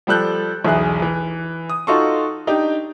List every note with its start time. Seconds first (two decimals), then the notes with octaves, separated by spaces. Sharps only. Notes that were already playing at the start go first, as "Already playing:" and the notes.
0.07 F3 G3 A4 F#6 G6
0.64 B1 E2 G#4 E5 F#6
1.02 E3
1.69 D#6
1.87 D#4 F4 F#4 A4 C6 C#6
2.47 D4 D#4 G4